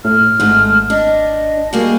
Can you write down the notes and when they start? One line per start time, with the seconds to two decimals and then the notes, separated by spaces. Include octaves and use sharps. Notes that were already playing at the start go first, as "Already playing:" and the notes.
0.05 A2 F6
0.40 G#1 G#2 A3
0.90 D4 D#5
1.73 G3 A#3 F#4 G#4